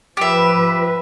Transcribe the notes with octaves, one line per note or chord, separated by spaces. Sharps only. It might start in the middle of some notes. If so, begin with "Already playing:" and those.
F3 G4 B4 E5